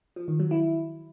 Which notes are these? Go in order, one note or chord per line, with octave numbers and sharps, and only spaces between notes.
F3
D#3
F#3
E4